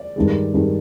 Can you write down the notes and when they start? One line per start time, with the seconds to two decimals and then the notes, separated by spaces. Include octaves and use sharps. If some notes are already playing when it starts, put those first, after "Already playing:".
Already playing: D5
0.16 G2 D#3 G#3
0.54 G2 D#3 G#3